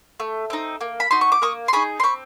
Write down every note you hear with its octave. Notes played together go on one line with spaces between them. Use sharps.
A3
C4 D#4
A#3
B5
D#4 F#4 C6
C#6
D6
A#3 C#6 D#6
C6
D#4 G#4 B5 C#6
C6
C4 B5 C#6